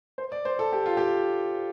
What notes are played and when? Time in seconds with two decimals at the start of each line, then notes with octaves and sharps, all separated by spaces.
0.18 C5
0.32 D5
0.45 C5
0.59 A4
0.72 G4
0.86 F4
0.97 G4